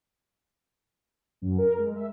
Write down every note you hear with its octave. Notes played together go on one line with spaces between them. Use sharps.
F#2
A#4
G#3
E5